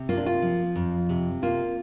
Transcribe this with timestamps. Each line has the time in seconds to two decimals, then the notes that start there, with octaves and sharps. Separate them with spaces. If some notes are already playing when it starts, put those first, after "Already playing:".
Already playing: C3
0.09 A#3 F4
0.17 D4
0.26 F4
0.42 F3
0.76 F2
1.09 C3
1.43 A#3 F4